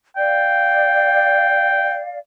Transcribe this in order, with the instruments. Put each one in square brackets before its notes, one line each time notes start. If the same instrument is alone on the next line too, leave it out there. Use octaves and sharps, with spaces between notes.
[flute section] D5 F5 [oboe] G5